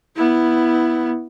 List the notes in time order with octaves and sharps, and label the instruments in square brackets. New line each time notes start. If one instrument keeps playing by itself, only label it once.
[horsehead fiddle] B3 E4